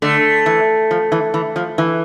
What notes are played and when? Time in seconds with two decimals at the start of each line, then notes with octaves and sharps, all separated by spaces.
0.02 D3 A3
0.46 E3
0.91 F3
1.12 E3
1.34 E3
1.56 F3
1.78 E3